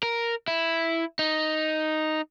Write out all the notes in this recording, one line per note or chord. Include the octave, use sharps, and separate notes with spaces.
A#4
E4
D#4